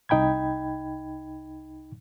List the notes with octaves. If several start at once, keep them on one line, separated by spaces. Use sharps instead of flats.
C2 D#4 G5 B5 G#6